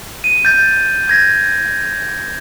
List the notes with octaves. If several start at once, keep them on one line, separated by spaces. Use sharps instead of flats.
D#7
G6 A6
G6 G#6 A#6